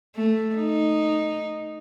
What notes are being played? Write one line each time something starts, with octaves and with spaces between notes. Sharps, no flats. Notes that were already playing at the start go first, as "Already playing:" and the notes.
A3
D#4